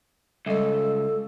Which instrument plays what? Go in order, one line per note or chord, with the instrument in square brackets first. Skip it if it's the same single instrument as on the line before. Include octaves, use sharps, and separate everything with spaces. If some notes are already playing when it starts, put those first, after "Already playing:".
[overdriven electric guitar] C#2 [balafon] G3 D#5 [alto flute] A4